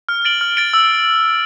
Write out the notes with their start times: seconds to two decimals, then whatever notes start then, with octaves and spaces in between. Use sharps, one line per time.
0.09 F6
0.25 A6 D7 F#7
0.41 F6
0.57 A6 D7 F#7
0.73 E6